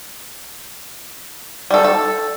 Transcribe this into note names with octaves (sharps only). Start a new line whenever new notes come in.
G3 A4
A4